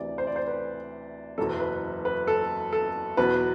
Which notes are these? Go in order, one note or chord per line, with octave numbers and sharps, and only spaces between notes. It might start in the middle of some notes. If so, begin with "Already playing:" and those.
Already playing: D2 C3 E3 D5
C5
D5
C5
B4
F#1 E2 B2 F#3 A4
B4
B4
A4
A4
E2 B2 F#3 B4